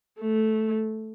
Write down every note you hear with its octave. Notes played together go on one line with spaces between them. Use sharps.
A3